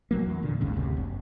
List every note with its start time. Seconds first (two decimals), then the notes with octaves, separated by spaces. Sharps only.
0.11 B1 F#3 A#3
0.26 E2
0.43 A#2 D3
0.61 G#1 D#2 G#2 C#3
0.76 F#1 D2 C3
0.97 F#1